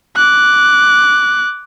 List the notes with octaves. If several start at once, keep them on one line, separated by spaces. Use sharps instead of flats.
D6 F#6